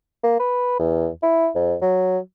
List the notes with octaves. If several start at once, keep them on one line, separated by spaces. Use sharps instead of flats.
A#3
B4
E2
E4
F2
F#3